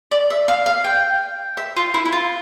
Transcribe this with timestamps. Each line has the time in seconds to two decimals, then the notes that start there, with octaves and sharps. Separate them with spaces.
0.11 D5
0.30 E5
0.48 F5
0.66 F5
0.84 G5
1.57 E5
1.76 F4
1.94 E4
2.05 E4
2.12 F4